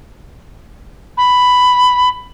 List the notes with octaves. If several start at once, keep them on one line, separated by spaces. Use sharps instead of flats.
B5